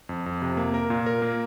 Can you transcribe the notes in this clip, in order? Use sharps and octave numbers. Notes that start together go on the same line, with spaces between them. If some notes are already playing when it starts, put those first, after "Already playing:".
F2
F2
C3
A#3
A#4
A#2
A#4
A#3